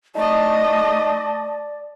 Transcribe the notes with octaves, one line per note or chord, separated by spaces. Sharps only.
A3 D#4 D5 D#5 A5